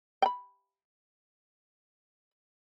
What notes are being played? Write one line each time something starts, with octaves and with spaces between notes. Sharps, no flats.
G5 B5